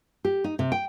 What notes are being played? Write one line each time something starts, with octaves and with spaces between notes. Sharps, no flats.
G4
D#4
C3
G5